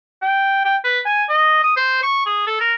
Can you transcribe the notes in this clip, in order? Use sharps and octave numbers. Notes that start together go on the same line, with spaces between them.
G5
G5
B4
G#5
D#5
D#6
C5
C#6
G#4
A4
A#4